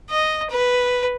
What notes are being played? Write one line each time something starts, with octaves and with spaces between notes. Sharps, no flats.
D#5
B4